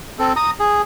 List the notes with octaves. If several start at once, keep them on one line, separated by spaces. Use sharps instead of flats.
C4 A4
A#5 D#6
G#4